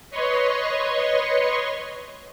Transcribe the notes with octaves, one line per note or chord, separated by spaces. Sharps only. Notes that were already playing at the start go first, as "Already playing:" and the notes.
B4 C#5 D#5 C6 C#6